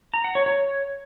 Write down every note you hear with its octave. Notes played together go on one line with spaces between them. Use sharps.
A#5
F#5
C#5
C#5